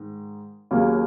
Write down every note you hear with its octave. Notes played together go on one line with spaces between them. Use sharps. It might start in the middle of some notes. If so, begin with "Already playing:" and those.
Already playing: G#2 D#3
D#2 C#3 F#3 A#3